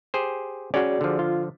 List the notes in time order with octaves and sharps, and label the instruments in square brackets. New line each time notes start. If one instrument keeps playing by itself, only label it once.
[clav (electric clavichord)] G4 G#4 C5
[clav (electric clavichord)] C#4 [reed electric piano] F#4 G#4 D5
[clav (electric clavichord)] D3 F3
[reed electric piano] F4